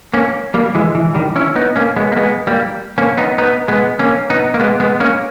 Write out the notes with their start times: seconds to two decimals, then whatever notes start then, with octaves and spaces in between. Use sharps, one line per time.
0.14 A#3 C#4
0.54 G3 A#3
0.75 E3 G#3
0.95 E3
1.15 D#3 G3
1.36 C#4 E4
1.56 B3 D#4
1.76 A#3 C#4
1.96 G#3 B3
2.12 A#3
2.16 G#3 B3
2.47 G3 A#3
2.98 A#3 C#4
3.17 B3 D#4
3.38 B3 D#4
3.68 G#3 B3
3.99 A#3 C#4
4.30 B3 D#4
4.54 A#3
4.60 G#3 B3
4.80 G#3 B3
5.00 A#3 C#4